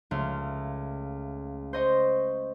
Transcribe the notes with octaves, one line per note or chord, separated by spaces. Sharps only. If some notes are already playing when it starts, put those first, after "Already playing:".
C#2 A3 F5
C5 D#5 C#6